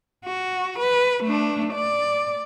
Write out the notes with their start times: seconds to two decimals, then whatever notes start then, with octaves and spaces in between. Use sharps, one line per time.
0.25 F#4
0.79 B4
1.24 A3 D4
1.73 D5